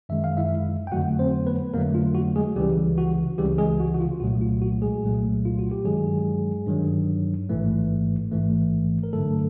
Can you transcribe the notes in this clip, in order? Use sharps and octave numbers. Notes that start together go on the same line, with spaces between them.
F#2 D#3 G#3 E5
F5
E4 E5
G5
F2 D3 F#3 A3 F#4 F#5
C4 C5
B3 B4
F2 D3 F#3 A3 A#3 A#4
F4
F#4
G#3 G#4
C#2 C#3 E3 G3 G4
F#4
C#2 C#3 E3 G3 G4
G#3 G#4
F#4
F#4
F4
C2 A#2 F#3 A3 F#4
F4
F#4
G#3 G#4
C2 A#2 F#3 A3
F4
F#4
G4
G2 D#3 F#3 G#3 G#4
G2 D#3 F#3
A1 G#2 E3 A3
A1 G#2 E3 A3
A#4
G2 D3 F#3 A3 A4